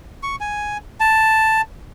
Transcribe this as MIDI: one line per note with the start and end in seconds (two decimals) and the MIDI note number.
0.23 0.36 85
0.41 0.77 80
1.00 1.61 81